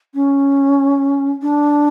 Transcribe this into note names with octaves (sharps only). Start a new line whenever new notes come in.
C#4
D4